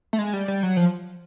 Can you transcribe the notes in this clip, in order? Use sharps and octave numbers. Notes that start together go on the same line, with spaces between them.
A3
G#3
G3
G3
F#3
F3